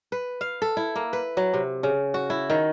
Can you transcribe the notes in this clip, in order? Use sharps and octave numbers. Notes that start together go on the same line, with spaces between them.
B4
F5
A4
E4
A#3
B4
F#3
C3
C#3
F#4
E4
D#3